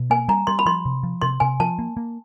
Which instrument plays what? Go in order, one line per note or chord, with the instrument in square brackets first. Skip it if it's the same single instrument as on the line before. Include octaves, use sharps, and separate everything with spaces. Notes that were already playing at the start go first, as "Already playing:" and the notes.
Already playing: [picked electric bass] B2
[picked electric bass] A#3 [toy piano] G#5
[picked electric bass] G3 [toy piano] A#5
[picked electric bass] G3 [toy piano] C6
[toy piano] B5
[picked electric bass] F3 [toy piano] C6
[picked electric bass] C3
F3
[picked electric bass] C3 [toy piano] C6
[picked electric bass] C3 [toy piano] G#5
[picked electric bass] F3 [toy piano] A5
[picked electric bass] A#3
A#3